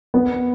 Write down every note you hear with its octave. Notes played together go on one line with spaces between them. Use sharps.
B3